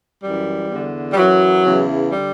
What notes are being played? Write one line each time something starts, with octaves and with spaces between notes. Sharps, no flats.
F#2 E3 G3
E2 D3
G3
F#2 E3 F#3
E2 C#3 E3
D3 G3